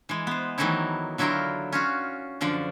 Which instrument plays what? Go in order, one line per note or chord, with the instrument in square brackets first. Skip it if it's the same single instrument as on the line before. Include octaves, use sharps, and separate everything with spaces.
[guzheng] E3 G#3
B3 C5
D#3 E3 F#3 A3 D#4 E4
D3 F#3 E4 F4 A#4 G5
C#4 F4 F#4
F#2 D3 F3 D5